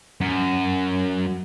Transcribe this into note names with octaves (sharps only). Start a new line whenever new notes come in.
F#2